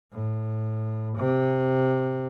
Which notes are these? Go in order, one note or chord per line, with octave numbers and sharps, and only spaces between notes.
A2
C3